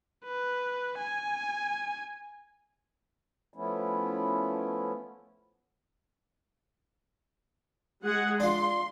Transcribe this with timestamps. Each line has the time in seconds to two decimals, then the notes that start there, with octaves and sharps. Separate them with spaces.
0.25 B4
0.98 G#5
3.54 F3 A3 B3 C#4 E4
8.03 G#3 G#4 F#5
8.40 D4 F4 C6